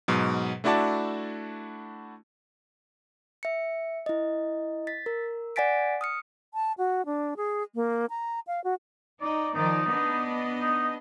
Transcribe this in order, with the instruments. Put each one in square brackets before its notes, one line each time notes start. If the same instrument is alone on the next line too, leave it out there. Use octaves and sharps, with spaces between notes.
[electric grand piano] G#2 B2 F#3
A3 D4 E4 F#4 D5 A5
[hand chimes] E5 C#7
E4 D#5
A6 B6
A#4
D5 F#5 G#5 A6 B6 D7
D#6 F6 C#7
[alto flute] A5
F#4
D4
G#4
A#3
A#5
F5
F#4
[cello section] D#4 [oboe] D5
[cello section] D#3 F3 D5 [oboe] D#4
[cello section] B3 D4 D#5
[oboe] D#4